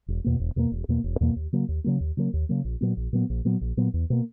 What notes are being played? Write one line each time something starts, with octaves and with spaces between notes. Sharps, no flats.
E1
E2 B2 A#3
E1
E2 B2 A#3
E1
E2 B2 A#3
E1
E2 B2 A#3
D#2
C#3 F#3 A#3
D#2
C#3 F#3 A#3
D#2
C#3 F#3 A#3
D#2
C#3 F#3 A#3
A#1
A#2 F#3 B3
A#1
A#2 F#3 B3
A#1
A#2 F#3 B3
A#1
A#2 F#3 B3
E2
B2 A#3